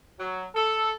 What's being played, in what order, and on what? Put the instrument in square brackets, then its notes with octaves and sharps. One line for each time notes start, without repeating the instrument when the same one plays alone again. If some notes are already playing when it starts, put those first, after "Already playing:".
[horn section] F#3
A4